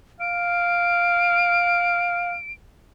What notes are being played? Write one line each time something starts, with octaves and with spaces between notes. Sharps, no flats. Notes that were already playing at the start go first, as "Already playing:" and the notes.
F5 D7